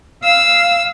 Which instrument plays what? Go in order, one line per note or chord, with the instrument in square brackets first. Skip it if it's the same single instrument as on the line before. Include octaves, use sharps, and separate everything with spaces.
[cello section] F5 [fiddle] E6